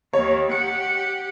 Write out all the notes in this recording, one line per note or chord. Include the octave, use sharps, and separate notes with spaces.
D#2 D#3 C#5
G4 F#5 C#7